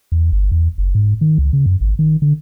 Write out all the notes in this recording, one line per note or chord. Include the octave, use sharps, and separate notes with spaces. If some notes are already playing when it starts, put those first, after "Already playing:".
E2
G1
E2
F#1
G#2
D#3
C#2
C#3
F#2
G#1
D#3
D3